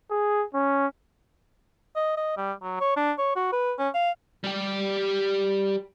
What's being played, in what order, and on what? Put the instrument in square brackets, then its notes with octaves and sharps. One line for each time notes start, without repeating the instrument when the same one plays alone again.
[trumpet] G#4
C#4
[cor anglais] D#5
D#5
G3
F#3
C#5
D4
C#5
F#4
B4
C#4
F5
[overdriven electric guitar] G3 G4